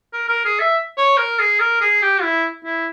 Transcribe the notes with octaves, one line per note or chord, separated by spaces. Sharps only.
A#4
A#4
G#4
E5
C#5
A#4
G#4
A#4
G#4
G4
E4
E4